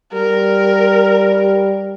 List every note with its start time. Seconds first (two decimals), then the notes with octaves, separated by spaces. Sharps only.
0.13 G3 A#4